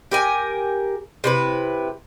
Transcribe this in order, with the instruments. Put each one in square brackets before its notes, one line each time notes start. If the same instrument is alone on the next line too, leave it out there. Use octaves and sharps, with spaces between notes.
[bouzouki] G4 A#4 G#5
C3 E4 B4